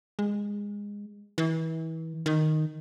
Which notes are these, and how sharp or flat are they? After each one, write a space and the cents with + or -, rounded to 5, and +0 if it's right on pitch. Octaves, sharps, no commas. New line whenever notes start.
G#3 -20
E3 -30
D#3 -5